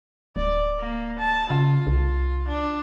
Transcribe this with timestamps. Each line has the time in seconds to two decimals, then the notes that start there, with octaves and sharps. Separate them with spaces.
0.36 D1 D5
0.79 A#3
1.18 A5
1.50 C#3 F4
1.87 C2
2.48 D4